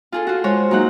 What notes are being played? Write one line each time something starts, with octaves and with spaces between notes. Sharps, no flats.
F4 G#4 A4
F4 F#4
G#3 C5 C#5
F#3 A#3 D#4 F#5